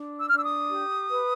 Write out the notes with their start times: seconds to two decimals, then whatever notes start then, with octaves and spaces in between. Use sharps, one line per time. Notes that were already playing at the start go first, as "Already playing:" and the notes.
Already playing: D4
0.19 E6
0.28 F6
0.32 D4 E6
0.44 D#6
0.70 G4
1.09 B4